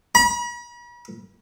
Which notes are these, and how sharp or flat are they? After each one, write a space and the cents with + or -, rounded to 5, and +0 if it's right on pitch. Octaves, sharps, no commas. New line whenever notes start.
B5 -45